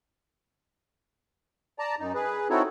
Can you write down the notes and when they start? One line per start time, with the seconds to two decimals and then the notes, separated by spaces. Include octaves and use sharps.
1.79 D5 A5 A#5
1.99 F#2 D#4
2.15 G#4 B4
2.50 C4 D#4 E4 F#4 A4 C#5